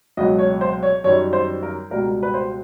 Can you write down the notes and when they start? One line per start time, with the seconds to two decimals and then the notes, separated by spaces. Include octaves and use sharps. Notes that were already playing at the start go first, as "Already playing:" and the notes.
0.17 C#2 B2 F#3 D#5
0.39 C#5
0.61 C5
0.83 C#5
1.04 F#2 D#3 G3 C#5
1.33 C5
1.63 A#4
1.90 C#2 B2 G3 A#4
2.23 B4
2.34 C5